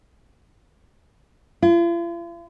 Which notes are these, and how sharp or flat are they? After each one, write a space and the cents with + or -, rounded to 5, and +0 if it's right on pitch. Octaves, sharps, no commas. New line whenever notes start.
F4 -45